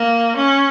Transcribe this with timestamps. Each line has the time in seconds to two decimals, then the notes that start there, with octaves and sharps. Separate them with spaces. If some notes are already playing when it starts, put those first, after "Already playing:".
Already playing: A#3
0.37 C#4